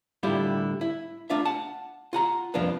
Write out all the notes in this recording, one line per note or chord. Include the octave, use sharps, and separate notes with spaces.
A2 D3 G3 E4 F4 G4
E4
A3 D4 F4 E5
F#5 A5
F4 F#5 A#5
C2 F2 F3 A#3 D4 B4